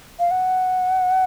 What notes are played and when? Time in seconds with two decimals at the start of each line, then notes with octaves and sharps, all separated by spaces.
0.20 F5
0.31 F#5